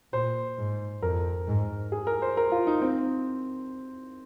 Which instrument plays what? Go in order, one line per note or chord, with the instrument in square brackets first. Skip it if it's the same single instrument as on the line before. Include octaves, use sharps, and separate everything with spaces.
[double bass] A#2 [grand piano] C5
[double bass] G#2
[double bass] F2 [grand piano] A#4
[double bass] G#2
[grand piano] G#4
A#4
C5
A#4
F4
D#4
C4